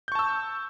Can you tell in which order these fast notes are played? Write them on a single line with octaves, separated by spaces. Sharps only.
G6 C#6 A5 E6